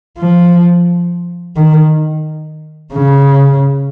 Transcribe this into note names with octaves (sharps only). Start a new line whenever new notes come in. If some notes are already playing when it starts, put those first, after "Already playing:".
F3
D#3
C#3